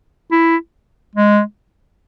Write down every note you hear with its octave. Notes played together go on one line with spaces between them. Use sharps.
E4
G#3